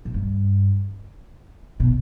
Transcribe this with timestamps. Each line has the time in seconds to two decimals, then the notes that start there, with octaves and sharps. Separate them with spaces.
0.05 A#2
0.14 G2
1.80 B2